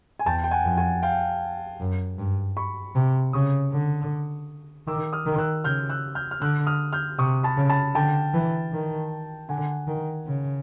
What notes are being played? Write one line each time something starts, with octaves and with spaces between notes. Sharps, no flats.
G#5
E2 G5 A5
G5
F#5 G#5
F2
F#5 G#5
F5 G5
F#2
G2
B5 C#6
C3
C#3 C#6 D#6
D3
D#3 D6 E6
D#6 F6
D#3
E6 F#6
C#3 F6 G6
E6 F#6
F6 G6
F6
D3 E6 F#6
D#6 F6
F6 G6
C3 C#6 D#6
A5 B5
C#3
A5 B5
D3 G5 A5
E3
D#3
D3 F#5 G#5
D#3
C#3